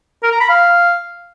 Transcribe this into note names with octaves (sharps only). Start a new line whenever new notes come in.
A#4
A#5
B5
F5